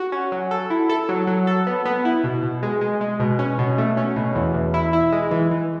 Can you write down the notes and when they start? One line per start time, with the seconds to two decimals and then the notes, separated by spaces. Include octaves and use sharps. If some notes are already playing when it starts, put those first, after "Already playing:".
Already playing: F#4
0.12 C#4
0.32 F#3
0.51 A4
0.70 E4
0.89 A4
1.09 F#3
1.27 F#3
1.47 A4
1.67 B3
1.85 B3
2.05 E4
2.24 B2
2.43 B2
2.63 G#3
2.81 G#3
3.01 G#3
3.20 B2
3.39 C#4
3.59 B2
3.78 A3
3.97 C#4
4.16 B2
4.35 E2
4.54 E2
4.74 E4
4.93 E4
5.12 G#3
5.31 E3
5.51 E3